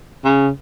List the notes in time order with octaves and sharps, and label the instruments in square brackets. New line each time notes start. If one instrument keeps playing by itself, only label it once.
[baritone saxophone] C#3